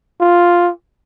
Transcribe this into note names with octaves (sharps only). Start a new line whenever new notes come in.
F4